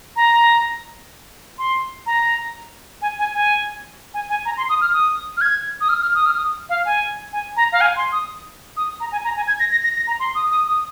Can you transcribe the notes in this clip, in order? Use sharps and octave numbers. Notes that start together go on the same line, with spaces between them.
A#5
C6
A#5
G#5
G#5
G#5
G#5
G#5
A#5
C6
D#6
F6
D#6
F6
G#6
D#6
F6
F6
D#6
F6
D#6
F5
G#5
G#5
A#5
F5
G#5
C6
D#6
D#6
A#5
G#5
A#5
G#5
G#6
A#6
A#6
A#6
A#6
A#5
C6
D#6
D#6
D#6